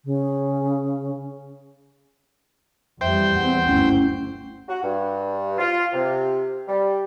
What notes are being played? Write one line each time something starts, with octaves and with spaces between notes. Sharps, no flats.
C#3
F2 E3 G3 C5 E5 G5
E2 C4 F#5
F#1 D2 G2 C#4 E4
F#4
G2
F4
C3
G3